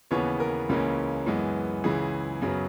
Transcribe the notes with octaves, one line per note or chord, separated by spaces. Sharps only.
D#2 C#3 E3 B3 C#5
A#4
C#2 C#3 E3 A#3 C#4
F#2 E3 G#3 B3
C#2 C#3 E3 G#4
F#2 C#3 F#3 B3